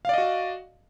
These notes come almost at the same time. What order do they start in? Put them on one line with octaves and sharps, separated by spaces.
F5 D5 D#5 F#4